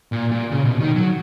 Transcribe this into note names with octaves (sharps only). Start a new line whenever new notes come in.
A#2
A#2
C#3
B2
D#3
F#3